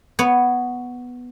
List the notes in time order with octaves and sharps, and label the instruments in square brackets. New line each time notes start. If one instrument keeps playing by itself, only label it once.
[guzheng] B3 C#5